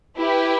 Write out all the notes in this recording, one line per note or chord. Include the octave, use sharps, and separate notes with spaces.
E4 G4 B4